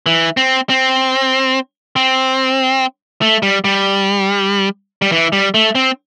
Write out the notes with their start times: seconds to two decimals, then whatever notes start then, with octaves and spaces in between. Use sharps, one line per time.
0.06 E3
0.37 C4
0.70 C4
1.96 C4
3.22 A3
3.43 G3
3.65 G3
5.02 G3
5.12 E3
5.33 G3
5.54 A3
5.75 C4